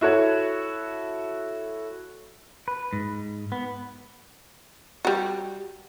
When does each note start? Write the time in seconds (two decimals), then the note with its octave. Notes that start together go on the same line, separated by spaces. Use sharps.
0.01 E4 F#4 A4 C#5
2.68 B4
2.93 G#2
3.52 B3
5.05 G3 F#4